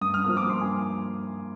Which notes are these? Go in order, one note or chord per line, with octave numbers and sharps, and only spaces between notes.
G2 D#6
F6
F3 A#3 D#6
D6
G2 C6
G#5